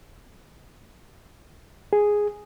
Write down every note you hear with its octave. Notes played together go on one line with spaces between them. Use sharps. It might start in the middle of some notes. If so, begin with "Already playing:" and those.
G#4